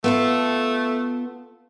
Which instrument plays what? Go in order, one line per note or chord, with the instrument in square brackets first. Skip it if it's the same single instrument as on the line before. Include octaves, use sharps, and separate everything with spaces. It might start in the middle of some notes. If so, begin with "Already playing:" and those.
[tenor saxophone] A3 [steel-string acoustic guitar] B3 F4 A4